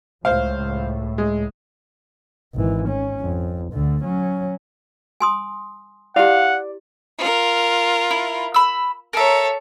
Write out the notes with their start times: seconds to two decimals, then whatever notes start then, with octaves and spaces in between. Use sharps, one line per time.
0.25 C#2 A2 C5 F5
1.18 G#3
2.54 G#1 E3
2.88 C#4
3.20 F2
3.73 D2 D3
4.04 F#3 C#4
5.20 G#5 C6 D#6
6.16 E4 G4 D5 F5 F#5
7.18 F4 A#4
8.11 E4
8.54 B5 E6
9.13 A4 A#4 C#5 E5